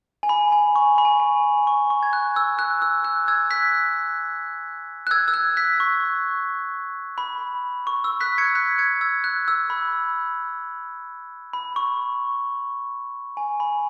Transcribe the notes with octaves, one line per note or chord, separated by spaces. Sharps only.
G#5
B5
G#5
C#6
B5
G#5
G#5
C#6
C#6
G#6
F#6
E6
F#6
E6
F#6
E6 G#6
F#6 B6
F#6
E6 G#6
E6
F#6
F#6 B6
C#6
B5
C#6
E6
F#6 B6
G#6 C#7
F#6 B6
G#6 C#7
E6 G#6
F#6
E6
B5
B5
C#6
G#5
B5